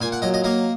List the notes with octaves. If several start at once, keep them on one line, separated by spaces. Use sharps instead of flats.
A#2 G#5
F#5
F#3 D#5
D#5
A#3 D#5